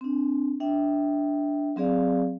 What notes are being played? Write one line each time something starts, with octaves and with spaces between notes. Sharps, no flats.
C4 D4
D4 E5 G5
F#3 C4 G#4 D5 F5